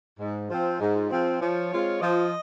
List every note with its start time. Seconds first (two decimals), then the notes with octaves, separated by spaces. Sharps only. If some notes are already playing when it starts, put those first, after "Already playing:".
0.19 G#2
0.49 F3 C4
0.79 G#2 D#4
0.95 F4
1.10 F3 C4 G#4
1.40 F3 C#5
1.71 G#3 C4 F4
2.01 F3 D#5